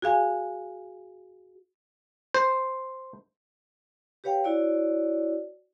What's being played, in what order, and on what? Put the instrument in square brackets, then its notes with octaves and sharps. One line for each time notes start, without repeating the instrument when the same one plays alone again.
[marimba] F#4 G#4 F5 G#5
[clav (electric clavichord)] C5
[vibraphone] G4 B4 C#5 F5 G5
E4 F#4 C#5 D5